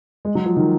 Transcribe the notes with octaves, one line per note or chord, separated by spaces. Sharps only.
G#3
F#3
F3
D#3